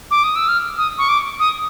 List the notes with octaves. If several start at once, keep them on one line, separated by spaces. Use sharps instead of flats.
D6
D#6
E6
F6
D#6
C#6
D6
D#6